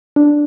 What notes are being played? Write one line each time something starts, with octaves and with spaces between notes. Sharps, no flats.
D4